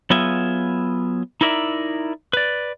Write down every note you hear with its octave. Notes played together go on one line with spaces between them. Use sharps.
F#3 B3 F4 G#4 E5
D#4 E4 A#4 D5 E5
B4 D5